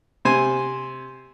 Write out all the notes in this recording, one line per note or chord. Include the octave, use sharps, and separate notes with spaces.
C3 C5 G#5 C6